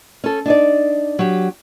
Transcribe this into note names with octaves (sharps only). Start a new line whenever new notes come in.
C#4 A4
D4 D#4 D5
F#3 G4